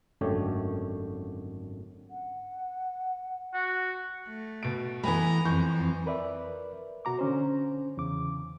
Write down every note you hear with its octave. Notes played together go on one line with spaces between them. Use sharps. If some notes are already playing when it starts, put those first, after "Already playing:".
G#1 F#2 D3 A3 G4 C#5
F#5
F#4
A3
B2 D7
E3 A3 B3 G#5 A#5 B5
F2 E3 C#6 G6
A#4 B4 D5 E5
B2 F#4 A#5 D6
D3 C#4 C5
E2 C#3 D6